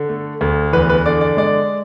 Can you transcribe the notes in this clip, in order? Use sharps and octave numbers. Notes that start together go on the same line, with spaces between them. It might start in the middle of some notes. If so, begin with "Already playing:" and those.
Already playing: D3
A3
D2
E2 B4
B4
D3 D5
D5
G#3 D5